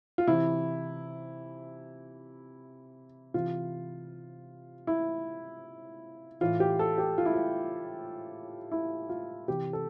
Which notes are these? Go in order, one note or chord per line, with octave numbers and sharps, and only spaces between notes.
F4
C3 E3 E4
C3 E3 F4
E4
A2 E3 F4
G4
A4
G4
F4
E4
F4
E4
F4
C3 E3 G4
A4